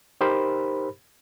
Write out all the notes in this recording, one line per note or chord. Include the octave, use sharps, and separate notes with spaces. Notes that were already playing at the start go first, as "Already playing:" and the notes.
D#4 G4 A#4 C5 B5